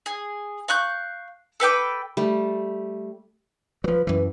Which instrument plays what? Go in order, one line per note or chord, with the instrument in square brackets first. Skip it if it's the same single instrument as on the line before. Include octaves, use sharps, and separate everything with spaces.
[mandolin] G#4
F5 C#6 F#6 G6
A4 B4 G5 D6
[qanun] G3 A3
[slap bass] F3 F#3 [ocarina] B4
[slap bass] F#2 E3 [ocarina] B4